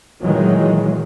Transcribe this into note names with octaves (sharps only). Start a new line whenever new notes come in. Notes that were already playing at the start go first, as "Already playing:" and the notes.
A#2 D#3 E3 F#3 G#3